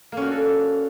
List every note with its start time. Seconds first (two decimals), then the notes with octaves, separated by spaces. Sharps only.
0.12 A#3
0.17 C#4
0.22 F#4
0.27 D4
0.31 A4